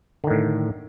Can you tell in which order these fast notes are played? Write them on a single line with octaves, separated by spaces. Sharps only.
D3 D#3 A2